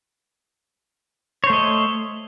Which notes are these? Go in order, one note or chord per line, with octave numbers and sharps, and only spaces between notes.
A3 C5 C#5 D#5